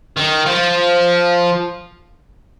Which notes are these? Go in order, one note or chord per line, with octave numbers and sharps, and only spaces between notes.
D#3
F3